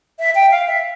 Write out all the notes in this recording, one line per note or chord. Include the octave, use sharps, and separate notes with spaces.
E5
G5
F5
E5